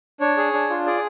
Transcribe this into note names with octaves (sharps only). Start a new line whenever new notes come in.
D4 C#5
G#4
D4
F4
G#4 D5